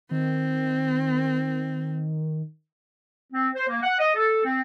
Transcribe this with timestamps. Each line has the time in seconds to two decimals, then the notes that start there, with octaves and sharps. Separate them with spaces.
0.11 D#3 C4
3.32 C4
3.54 C5
3.68 A#3
3.83 F#5
3.99 D#5
4.14 A4
4.44 C4